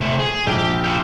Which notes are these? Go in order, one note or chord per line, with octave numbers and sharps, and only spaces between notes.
C3 A3
G#4
A#1 G4 G5
F4 G4